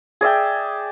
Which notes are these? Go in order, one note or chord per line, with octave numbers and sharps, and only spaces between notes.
G#4 D5 E5 G5